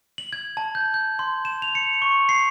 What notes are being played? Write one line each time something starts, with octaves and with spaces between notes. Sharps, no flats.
F#7
G#6
A5
G6
G6
C6
E7
F7
C#7
C#6
C7